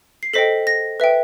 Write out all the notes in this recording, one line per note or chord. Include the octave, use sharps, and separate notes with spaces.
C7
A4 C5 D#5 G5 B6
A#6
B4 E5 G5